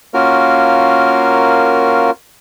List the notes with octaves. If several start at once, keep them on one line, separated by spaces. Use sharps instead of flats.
A#3 C#4 F4 F#4 A#4